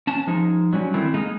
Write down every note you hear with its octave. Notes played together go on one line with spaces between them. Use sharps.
C#4 A5
F3 G#3 D#4
F#3 G3 C#4
D#3 A3 C4 E4
G#3 A#3 D#4 G#4